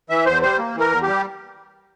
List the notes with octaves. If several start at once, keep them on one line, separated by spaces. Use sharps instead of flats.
E3 E5
E2 C5
G3 C5
A#3
E3 A#4
E2
G4
G3